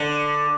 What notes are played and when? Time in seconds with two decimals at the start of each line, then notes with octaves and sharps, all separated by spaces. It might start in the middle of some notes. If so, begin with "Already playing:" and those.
Already playing: D3